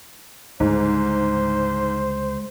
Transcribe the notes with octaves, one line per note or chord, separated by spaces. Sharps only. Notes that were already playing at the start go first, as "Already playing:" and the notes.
C#2 G#2 D3 G3 G#3 C5